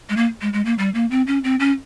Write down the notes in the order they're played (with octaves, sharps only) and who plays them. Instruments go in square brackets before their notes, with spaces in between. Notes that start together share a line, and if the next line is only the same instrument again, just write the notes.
[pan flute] G#3
A#3
G#3
G#3
A#3
G3
A#3
C4
C#4
C4
C#4